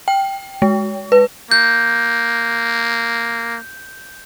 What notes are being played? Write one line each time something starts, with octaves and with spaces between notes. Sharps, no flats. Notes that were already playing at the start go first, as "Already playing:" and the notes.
G5
G#3
B4
A#3 G6